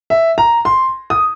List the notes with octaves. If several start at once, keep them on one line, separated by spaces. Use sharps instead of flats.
E5
A#5
C6
D#6